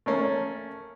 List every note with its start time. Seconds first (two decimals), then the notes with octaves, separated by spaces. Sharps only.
0.06 A3 A#3 C#4